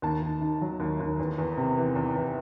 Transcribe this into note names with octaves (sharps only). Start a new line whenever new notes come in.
D#2 A5
D#2
D#3
F#3
D#2
D#2
E2
E2
C3
E3
E2
E2